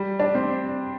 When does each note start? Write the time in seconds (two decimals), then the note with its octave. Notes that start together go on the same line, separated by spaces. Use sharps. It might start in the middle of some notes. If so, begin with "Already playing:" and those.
Already playing: G3
0.19 D4
0.35 C4